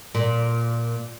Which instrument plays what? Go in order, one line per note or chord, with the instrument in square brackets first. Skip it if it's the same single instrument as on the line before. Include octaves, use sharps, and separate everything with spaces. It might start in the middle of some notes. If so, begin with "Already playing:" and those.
[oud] A#2